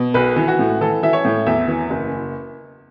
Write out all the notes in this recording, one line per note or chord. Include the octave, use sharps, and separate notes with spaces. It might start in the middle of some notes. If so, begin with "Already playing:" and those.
Already playing: B2
B1 B4
E3
F#4
A2
E3 A4
E3 E5
C#5
A2
E2 E5
E3
F#1